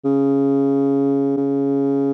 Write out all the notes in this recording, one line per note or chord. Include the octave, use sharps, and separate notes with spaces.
C#3
C#3